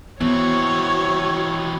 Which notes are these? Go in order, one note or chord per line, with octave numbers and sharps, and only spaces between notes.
E3 B3 C4 F#4 C#5